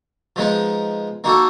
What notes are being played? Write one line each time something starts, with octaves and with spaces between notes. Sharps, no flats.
F3 G#3 B3 D#4
A#3 D#4 F#4 A4